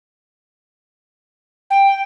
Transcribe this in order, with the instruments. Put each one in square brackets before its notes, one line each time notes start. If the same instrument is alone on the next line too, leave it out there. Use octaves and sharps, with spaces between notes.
[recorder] G5